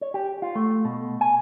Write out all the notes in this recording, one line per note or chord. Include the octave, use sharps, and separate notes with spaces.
C#5
G4
F4
A3
B2
G#5